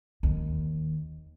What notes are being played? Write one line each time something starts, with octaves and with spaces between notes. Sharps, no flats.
D#2